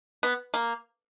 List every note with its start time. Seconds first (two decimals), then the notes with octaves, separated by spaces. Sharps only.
0.23 B3
0.54 A#3